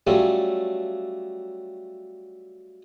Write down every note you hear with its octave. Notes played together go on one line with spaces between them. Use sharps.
F#3 G3 A3 C#4 F4